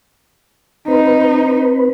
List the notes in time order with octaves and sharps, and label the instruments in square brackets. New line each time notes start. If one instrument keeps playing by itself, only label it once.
[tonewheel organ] C4 B4 [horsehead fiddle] D#4